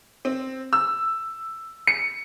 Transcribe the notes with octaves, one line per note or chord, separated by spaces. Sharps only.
C4
E6
C#7